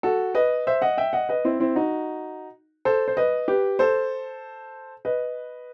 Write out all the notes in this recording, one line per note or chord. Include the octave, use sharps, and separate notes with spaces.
F#4 A4
B4 D#5
C5 E5
D#5 F#5
E5 G5
D#5 F#5
B4 D#5
C4 E4
C4 E4
D#4 F#4
A4 C5
C5
B4 D#5
G4 B4
A4 C5
B4 D#5